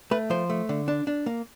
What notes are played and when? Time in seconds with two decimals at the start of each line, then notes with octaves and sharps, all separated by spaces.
0.11 A3 B4
0.30 F3 C5
0.50 A3
0.69 D3
0.88 D4
1.07 D4
1.26 A#3